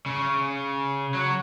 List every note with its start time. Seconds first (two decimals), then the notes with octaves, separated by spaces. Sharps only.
0.06 C#3
1.14 F#3